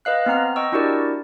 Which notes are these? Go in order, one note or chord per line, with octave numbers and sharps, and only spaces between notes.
B4 D#5 F5 F#6
B3 C4 A#5 F6
D#5 G5 C#6 E6
D4 E4 F#4 G4 A#4 D5